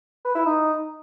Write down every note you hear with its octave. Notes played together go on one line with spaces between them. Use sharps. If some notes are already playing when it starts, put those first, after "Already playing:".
B4
E4
D#4